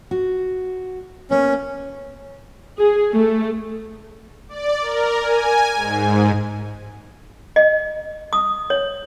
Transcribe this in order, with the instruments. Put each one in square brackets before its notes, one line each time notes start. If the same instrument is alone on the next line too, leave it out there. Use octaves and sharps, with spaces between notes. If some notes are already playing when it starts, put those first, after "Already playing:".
[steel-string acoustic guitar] F#4
[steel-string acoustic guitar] A#3 B3 [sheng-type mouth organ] C#4
[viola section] G#4
A3
[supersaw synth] D5
A#4
G#5
G#2
[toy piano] D#5
D#6
C#5